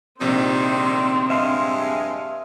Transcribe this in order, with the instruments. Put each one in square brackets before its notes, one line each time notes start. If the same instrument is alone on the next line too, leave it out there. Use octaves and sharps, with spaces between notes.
[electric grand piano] A#1 C3 [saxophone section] D#3 G3 D#4 [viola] C4
[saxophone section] G2 G#3 [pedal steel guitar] E5 F5 C6